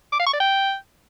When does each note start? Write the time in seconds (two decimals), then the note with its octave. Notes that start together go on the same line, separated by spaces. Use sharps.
0.12 D6
0.19 F5
0.26 C#6
0.33 D5
0.40 G5